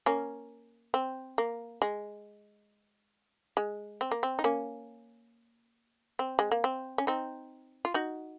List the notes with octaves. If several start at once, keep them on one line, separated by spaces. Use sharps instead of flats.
A#3 C#4
C4
A#3
G#3
G#3
C4
A#3
C4
D#4
A#3 C#4
C4
G#3
A#3
C4
C#4
C4 D#4
F4
D#4 F#4